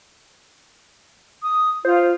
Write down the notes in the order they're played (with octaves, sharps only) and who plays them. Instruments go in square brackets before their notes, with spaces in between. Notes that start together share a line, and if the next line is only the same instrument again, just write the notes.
[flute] D#6
[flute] F4 [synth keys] C5 F5